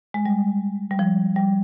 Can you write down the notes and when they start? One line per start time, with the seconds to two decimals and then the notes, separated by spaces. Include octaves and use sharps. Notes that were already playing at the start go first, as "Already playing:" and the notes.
0.14 G#3
0.26 G3
0.91 G3
0.99 F3
1.36 G3